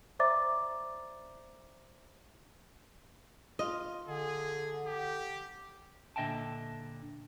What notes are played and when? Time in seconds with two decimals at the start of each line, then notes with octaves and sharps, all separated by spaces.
0.19 C5 D5 E5 A#5 D6 A6
3.59 F4 D#5
4.08 D3 G#4
4.87 G4
6.16 A#2 D3 D#5 E5 G5 A5